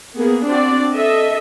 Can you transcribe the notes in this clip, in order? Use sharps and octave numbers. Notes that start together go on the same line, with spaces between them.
A#3 B3 G#4
C4 D4 F#4 D5
A4 D#5 E5